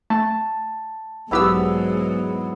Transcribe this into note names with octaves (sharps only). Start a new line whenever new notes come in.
A3 A5
B1 E2 G#2 F#3 B3 E4 G4 E6